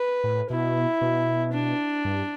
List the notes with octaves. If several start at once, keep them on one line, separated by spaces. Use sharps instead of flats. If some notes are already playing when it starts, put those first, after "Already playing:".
Already playing: B4
A2
B2 E4
B2
D4
G2